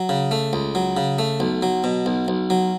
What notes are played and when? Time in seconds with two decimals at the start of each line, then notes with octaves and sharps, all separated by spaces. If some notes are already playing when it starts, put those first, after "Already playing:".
Already playing: F#3
0.09 C#3
0.31 A3
0.53 C#2
0.75 F#3
0.97 C#3
1.19 A3
1.40 B1
1.62 F#3
1.84 B2
2.06 B1
2.28 B1
2.50 F#3